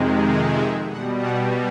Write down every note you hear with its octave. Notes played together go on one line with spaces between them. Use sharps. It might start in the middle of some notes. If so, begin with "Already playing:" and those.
Already playing: F2 C3 D#3 G#3
D#5
E5
B2 G3 F#5
F#5